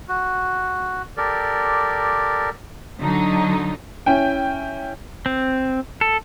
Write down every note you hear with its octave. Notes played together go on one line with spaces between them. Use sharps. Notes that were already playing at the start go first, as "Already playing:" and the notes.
F#4
G4 A4 A#4 D5
D3 F#3 D#4
C#4 E4 G5
C4
A4